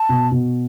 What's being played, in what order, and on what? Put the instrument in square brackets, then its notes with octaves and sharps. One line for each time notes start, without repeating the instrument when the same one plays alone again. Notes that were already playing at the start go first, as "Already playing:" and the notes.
Already playing: [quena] A5
[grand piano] B2
B2